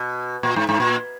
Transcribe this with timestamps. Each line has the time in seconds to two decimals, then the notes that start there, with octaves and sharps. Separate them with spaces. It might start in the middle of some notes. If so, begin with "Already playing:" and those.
Already playing: B2
0.43 A#2
0.56 G#2
0.69 G#2
0.80 A#2